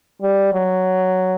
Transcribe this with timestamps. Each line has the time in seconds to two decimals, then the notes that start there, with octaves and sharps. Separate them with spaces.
0.22 G3
0.53 F#3